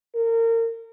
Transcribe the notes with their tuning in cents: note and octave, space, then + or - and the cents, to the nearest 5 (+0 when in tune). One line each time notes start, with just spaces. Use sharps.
A#4 -30